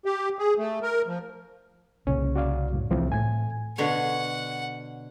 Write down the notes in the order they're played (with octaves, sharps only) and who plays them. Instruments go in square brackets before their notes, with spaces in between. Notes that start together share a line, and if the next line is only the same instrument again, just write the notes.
[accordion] G4
G#4
A3
A#4
F3
[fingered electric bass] C2 A#2 C#3 [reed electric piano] C#4
[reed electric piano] F#4 D5 F5
F#2 A2
[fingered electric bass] C2 E3 A3 [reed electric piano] F3 C4 E4
[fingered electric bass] A2 A3 [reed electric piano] G#5 G#6
[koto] B2 D3 C#5 [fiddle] F#5